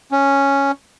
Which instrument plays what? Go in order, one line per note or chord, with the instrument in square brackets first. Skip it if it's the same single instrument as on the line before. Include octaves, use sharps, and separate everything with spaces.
[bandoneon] C#4